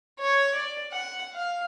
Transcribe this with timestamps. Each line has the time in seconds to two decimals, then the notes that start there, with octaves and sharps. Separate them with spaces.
0.20 C#5
0.55 D5
0.92 F#5
1.34 F5